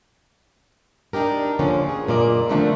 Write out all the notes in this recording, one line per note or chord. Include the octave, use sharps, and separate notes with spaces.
D4 D#4 G4 A#4
D3 F3 A#3 C#4
G#4
F#2 A#2 A#3 D5 D#5
D3 D#3 F3 A3 C4 D4